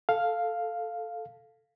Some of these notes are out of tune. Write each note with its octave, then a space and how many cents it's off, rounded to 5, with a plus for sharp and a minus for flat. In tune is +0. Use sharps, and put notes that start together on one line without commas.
A4 +0 F5 +0